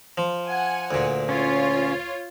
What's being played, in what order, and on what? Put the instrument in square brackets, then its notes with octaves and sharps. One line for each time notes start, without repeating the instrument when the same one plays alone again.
[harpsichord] F3
[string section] F#5 G#5
[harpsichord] D2 A#2
[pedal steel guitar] C#4 [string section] F4 C#5